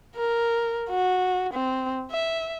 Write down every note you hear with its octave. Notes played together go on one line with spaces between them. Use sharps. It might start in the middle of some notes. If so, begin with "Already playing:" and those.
A#4
F#4
C4
E5